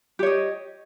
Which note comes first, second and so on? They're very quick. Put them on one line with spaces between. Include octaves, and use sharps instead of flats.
G4 C#5 D#5